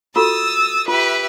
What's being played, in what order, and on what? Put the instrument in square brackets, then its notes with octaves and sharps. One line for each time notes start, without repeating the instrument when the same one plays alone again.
[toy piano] F4 F#4 A4 [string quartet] D#6 E6 A6
[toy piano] F4 [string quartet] G4 B4 E5